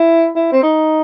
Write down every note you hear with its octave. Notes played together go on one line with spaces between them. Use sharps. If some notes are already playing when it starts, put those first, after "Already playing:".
Already playing: E4
E4
C4
D#4